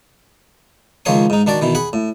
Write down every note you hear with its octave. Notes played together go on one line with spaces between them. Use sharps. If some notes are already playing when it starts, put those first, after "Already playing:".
C#2 D#3 F3 C#5 C6 D#6
G#2 D#4
D#3 D4 F#4 D5
B2 D#3 E3
G#4 F#5 B5
A2